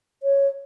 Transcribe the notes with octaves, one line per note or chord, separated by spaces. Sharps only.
C#5